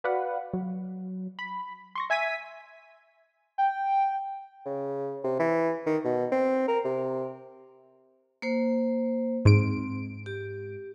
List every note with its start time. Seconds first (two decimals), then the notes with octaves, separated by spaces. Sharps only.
0.04 F#4 B4 D5 F5 F#5
0.53 F#3
1.39 B5
1.95 C6 C#6 A#6
2.10 E5 G#5 G#6 B6 D#7
3.58 G5
4.66 C#3
5.24 C3
5.40 E3
5.86 D#3
6.04 B2
6.32 C4
6.68 A#4
6.85 C3
8.42 A#3 C5
9.45 G#2 C4 D7
10.26 G4